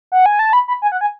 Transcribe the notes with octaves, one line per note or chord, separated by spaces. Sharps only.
F#5
G#5
A5
B5
B5
G#5
F#5
G#5